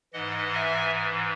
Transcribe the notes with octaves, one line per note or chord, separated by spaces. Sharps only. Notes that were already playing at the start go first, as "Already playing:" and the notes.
G#2 E3 D#5 F#5
E5 G#5